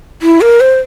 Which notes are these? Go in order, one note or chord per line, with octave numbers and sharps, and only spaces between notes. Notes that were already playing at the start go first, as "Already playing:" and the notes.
E4
A#4
C5